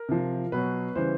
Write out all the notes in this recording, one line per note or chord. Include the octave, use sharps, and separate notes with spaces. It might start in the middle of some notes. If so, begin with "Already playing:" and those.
Already playing: A#4
C3 F3
B2 F#3 B4
C#3 E3 G3 C5